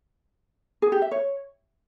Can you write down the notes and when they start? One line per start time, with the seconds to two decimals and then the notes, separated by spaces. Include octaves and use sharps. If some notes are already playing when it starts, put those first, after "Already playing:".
0.82 G#4
0.92 G4
1.02 E5
1.11 C#5